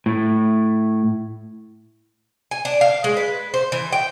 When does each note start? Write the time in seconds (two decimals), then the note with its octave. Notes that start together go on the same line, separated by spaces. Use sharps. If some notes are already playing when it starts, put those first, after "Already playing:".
0.06 A2
2.51 G#5
2.65 D4
2.81 F5
3.04 G#3
3.17 B4
3.54 C5
3.72 E3
3.92 G5